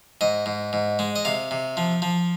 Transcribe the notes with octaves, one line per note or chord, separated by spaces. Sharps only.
G#2 D#5
G#2
G#2
G#3
D#5
C3 F5
C3
F3
F3